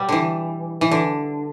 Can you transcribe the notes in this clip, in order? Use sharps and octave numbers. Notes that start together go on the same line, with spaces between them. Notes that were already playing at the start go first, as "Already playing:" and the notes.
Already playing: B2 G3
D3 E3
E3
D3